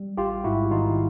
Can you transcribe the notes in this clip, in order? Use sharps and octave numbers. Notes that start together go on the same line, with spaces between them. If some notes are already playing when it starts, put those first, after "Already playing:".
Already playing: G3
A1 F4 G4
G#2 E4 F#4
D#3 D#4 F4